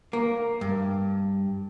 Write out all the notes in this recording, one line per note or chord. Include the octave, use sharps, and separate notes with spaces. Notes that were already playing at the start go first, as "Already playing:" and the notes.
A#3
G2